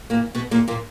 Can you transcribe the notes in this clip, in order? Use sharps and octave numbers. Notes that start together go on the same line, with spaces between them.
A#2 A#3
B2 B3
A#2 A#3
A#2 A#3